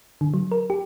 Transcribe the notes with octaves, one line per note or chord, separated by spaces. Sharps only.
D3
F#3
A#4
G4